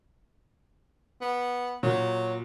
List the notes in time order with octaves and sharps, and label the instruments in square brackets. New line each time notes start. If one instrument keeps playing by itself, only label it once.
[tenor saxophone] B3
[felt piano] A#2 [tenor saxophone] F#3